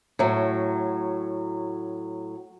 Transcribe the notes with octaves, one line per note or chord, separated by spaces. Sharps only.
A2 F#3